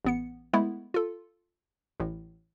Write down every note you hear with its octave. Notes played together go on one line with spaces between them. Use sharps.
A1 B3 C#7
G#3 A3 B3 E4
F4 A4
A1 A2